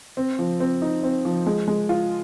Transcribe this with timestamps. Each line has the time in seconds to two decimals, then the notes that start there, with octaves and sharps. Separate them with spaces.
0.17 C4
0.39 F3
0.60 C4
0.82 D#4
1.03 C4
1.25 F3
1.47 G#3
1.68 G#3
1.89 F4